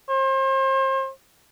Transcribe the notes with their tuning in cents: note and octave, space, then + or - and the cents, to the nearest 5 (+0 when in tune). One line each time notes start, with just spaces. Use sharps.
C5 +35